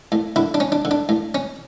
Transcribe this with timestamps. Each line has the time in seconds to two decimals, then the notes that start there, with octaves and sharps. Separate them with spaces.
0.12 A2
0.36 D3 E4
0.54 D4
0.60 C#4
0.72 D4
0.85 D3
0.91 D4
1.09 A2
1.35 C#4